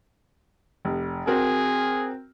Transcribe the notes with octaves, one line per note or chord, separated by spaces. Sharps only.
F1
C4 F#4 G#4 A#4